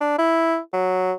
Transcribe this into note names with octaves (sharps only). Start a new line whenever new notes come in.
D4
E4
F#3